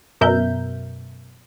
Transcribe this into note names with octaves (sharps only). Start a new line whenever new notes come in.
F#2 B2 A#4 E5 G6